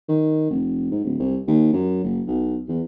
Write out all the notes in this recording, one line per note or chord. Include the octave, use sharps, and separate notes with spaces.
D#3
F1
G#2
D1
C2
D#2
F#2
F#1
B1
E2